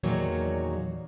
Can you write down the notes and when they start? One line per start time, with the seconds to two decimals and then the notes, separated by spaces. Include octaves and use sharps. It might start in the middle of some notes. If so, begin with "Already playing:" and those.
0.04 E2 A#2 D#3 F#3 A#3 C#5